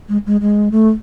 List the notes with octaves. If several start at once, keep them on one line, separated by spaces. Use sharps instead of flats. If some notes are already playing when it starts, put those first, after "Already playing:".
G#3
G#3
G#3
A3